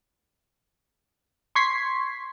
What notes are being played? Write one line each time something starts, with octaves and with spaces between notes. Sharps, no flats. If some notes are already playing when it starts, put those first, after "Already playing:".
C6 C#6 G#6 B6 C7